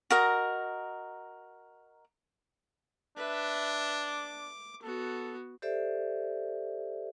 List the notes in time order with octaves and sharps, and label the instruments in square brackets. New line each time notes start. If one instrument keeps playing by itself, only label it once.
[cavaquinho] F#4 A#4 D#5 A#5
[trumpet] D4 [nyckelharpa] B4 E5
[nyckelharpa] D6
[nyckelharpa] B3 F#4 [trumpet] A4
[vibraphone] G4 A4 C5 D5 E5